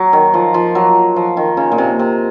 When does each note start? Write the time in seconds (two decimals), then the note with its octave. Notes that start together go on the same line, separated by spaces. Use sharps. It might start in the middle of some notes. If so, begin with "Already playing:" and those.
Already playing: F#3
0.13 D#3
0.34 F3
0.54 F3
0.75 F#3
1.16 F3
1.37 D#3
1.57 C#3
1.72 A#2
1.78 C3
1.99 C3